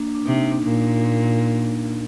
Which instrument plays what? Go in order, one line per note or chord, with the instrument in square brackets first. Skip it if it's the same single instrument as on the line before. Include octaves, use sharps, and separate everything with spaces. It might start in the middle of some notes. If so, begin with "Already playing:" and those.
Already playing: [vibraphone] A#3 D4
D4
[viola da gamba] C3 [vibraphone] D#4
[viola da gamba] A#2